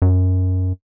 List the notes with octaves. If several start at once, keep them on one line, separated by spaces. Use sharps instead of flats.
F#2